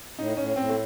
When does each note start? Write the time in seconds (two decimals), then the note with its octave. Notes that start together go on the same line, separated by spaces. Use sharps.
0.18 A2 D#4
0.37 A2 C#4
0.56 A2 C4
0.69 A3